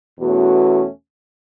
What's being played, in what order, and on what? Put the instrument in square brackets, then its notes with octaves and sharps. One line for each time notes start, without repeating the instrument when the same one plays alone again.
[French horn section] E2 B2 A3 C#4 F#4